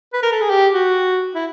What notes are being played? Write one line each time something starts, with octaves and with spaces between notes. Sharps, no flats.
B4
A#4
A4
G#4
G4
F#4
E4